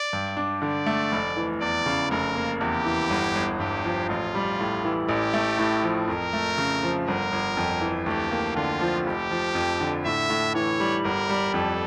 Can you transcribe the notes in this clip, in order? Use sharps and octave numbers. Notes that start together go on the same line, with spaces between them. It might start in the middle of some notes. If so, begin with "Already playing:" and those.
Already playing: D5
G2
D4
D3 D5
A3
F1
E3
E2 D5
C#3
F1 A#4
A#3
E2 G4
E3
G1
G1
G2 G4
F3
A1 F4
G3
A2
E3
A1 G4
A3
A2
F3
F2 A#4
A3
C#3
F3
G1 A#4
G1
F2
E3
D2 G4
A#3
D3 F4
F3
F1 G4
F3
F2
D3
A2 E5
A2
E3 C#5
G3
G1 A#4
G3
F2 A4